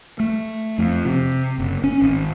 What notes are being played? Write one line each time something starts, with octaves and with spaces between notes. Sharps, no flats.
A3
F2
C3
F#1
C#4
G#1